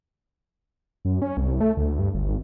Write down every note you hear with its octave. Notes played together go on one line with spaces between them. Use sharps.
F#2
C#4
C2
A3
D2
G2
G1
G#1